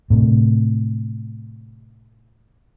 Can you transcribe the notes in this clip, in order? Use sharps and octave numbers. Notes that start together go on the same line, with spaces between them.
A2 C3